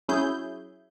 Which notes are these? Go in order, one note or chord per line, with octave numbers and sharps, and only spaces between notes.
F#3 C#4 E4 G#4 G6